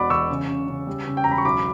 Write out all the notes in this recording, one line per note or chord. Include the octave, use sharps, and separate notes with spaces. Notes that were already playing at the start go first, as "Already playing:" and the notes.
Already playing: E1 B2 D5 F#5 B5 D6
E2 C#6 E6
C#3
C#3
C#3
G3
C#3
G5
E1 A#5
B5
C#6
B1 B5 D6